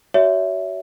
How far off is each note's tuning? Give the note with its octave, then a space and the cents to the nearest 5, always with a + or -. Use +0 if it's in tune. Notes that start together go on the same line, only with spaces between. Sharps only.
F#4 +35 C#5 +30 E5 +0